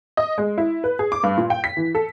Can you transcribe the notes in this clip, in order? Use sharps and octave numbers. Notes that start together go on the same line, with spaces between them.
D#5
G#3
E4
B4
G#4
D6
G2
A#2
G5
B6
E3
A4